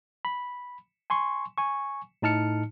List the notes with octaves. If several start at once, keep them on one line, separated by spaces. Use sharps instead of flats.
B5
G#5 C6 C#6
G#5 C#6
A2 D#4 A5 F6 C#7